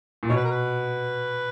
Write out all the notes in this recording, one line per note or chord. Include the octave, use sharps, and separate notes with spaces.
A#2
B2 C#5
B4
A#4
B4